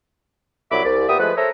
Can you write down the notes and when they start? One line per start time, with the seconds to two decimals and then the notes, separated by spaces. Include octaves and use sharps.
0.72 C2 F#3 D5 E5 B5 D6
0.85 C2 D5
1.08 A#2 B3 G4 E5 D#6
1.20 F3 G#3 A3 B4
1.37 A4 A#4 C5 C#5 E5 A#5